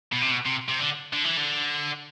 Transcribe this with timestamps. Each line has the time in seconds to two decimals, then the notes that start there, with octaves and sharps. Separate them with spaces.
0.12 B2
0.22 C3
0.31 B2
0.46 C3
0.69 C3
0.79 D3
1.13 D3
1.25 E3
1.37 D3